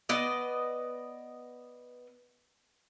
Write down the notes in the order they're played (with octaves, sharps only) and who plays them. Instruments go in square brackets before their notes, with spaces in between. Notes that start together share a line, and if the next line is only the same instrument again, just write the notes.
[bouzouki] B3 D5 D#5